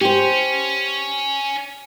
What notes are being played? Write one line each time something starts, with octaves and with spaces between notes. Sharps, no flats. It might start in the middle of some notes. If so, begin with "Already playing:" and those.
C#4 G4 C5